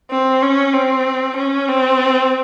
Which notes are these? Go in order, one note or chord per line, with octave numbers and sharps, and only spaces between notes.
C4
C#4
C4
C#4
C4